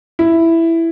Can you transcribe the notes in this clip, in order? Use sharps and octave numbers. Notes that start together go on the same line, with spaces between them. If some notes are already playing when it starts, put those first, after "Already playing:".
E4